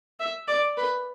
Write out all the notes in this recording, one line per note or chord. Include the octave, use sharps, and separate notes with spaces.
E5
D5
B4